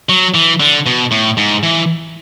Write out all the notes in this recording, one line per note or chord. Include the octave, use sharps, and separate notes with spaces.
F#3
E3
D3
B2
A2
G#2
E3